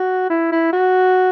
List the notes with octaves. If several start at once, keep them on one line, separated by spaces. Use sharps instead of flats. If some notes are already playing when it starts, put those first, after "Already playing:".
Already playing: F#4
E4
E4
F#4